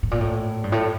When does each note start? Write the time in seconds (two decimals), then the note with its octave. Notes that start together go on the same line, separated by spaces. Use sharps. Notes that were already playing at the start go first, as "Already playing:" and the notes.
0.03 A2
0.11 A#2
0.21 A2
0.64 G2
0.72 A2